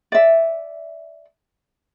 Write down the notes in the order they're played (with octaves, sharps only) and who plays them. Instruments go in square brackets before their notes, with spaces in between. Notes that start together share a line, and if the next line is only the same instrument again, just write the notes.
[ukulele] D5 E5